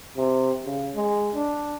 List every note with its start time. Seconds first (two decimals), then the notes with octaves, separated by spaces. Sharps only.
0.17 C3
0.66 C#3
0.96 G#3
1.35 D4